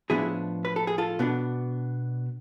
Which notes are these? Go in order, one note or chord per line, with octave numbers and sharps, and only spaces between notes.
A2 F3 B3 D4 E4 G#4
B4
A4
G#4
F4 A4
B2 B3 D4